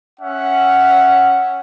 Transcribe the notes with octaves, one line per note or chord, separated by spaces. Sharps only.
C#4 E5 F#5